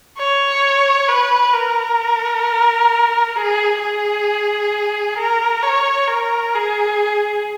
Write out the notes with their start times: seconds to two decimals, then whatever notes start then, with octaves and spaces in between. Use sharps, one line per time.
0.18 C#5
1.08 B4
1.53 A#4
3.36 G#4
3.81 G#4
5.17 A#4
5.63 C#5
6.08 A#4
6.54 G#4